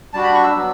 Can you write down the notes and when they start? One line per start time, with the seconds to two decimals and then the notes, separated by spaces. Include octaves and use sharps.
0.13 G3 D4 F#4 A5
0.23 B5
0.34 C#6
0.44 E6
0.54 F#3 B3 D4